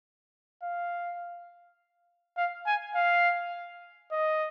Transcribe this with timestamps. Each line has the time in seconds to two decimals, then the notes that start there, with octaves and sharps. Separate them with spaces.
0.63 F5
2.37 F5
2.66 G#5
2.95 F5
4.12 D#5